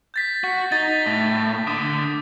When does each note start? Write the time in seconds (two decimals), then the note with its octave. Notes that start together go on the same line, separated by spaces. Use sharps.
0.14 G6 A6 B6
0.44 F#4
0.72 D#4 A6
1.06 A2
1.67 D3 D#6